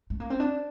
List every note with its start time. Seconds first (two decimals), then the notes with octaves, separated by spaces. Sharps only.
0.10 A3
0.20 A#3
0.30 C4
0.40 D4